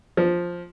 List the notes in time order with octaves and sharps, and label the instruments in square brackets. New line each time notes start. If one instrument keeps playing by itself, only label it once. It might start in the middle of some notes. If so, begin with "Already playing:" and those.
[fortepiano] F3